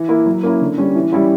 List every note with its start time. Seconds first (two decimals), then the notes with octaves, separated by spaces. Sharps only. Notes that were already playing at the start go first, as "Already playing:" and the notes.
Already playing: E3
0.09 A#3 E4
0.26 F#3
0.43 A#3 C#4 E4
0.61 D3
0.78 G3 C#4
0.95 E3
1.12 G3 C#4 E4